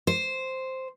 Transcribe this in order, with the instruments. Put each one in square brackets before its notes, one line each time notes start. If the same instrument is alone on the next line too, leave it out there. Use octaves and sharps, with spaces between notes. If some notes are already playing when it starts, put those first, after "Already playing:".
[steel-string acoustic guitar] C5